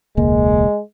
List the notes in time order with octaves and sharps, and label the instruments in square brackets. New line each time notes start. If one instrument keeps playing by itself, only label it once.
[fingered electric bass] E1 C#2 A#3 [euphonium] G#3